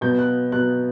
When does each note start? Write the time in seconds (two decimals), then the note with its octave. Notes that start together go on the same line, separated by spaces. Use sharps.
0.01 B2 F#3 B3 G6
0.19 F#6
0.52 B2 F#3 B3 F#6